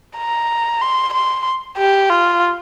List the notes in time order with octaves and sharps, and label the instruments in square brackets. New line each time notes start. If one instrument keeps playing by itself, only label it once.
[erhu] A#5
C6
C6
G4
F4